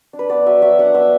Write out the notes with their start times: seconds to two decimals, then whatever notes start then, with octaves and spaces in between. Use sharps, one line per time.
0.13 D4
0.19 B4
0.30 B3 D5
0.46 F#3 E5
0.62 F#3 E5
0.79 D4 F#5
0.94 B3 E5